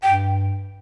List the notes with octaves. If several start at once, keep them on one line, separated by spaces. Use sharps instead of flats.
G2 G5